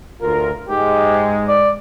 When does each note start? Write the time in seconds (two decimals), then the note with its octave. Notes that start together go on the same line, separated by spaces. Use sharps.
0.21 D2 F4 A#4
0.69 G#2 G#3 G4
1.49 D5